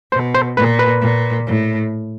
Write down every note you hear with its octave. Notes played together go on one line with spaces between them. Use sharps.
B2 C5
C5
A#2 B4
B4
A#2
A2